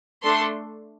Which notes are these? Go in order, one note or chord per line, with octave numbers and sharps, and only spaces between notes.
A3 D4 A4 C6